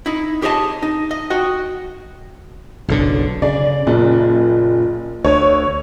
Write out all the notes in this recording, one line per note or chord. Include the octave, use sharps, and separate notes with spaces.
D#4 E4
G4 G#4 C#5 D#5 A5
D#4
D#5
F#4 D#5 G5
F#1 B1 D3
C#3 D5
F#1 A#2
D2 C#5